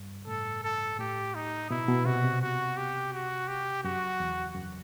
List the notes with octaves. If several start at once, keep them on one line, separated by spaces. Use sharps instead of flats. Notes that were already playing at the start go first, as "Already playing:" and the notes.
Already playing: G2
A2 A4
A4
A2 G4
D#4
B2 E4
B2
C3 F#4
C3
F#4
G4
F#4
G4
F#2 F#4
E2
F#2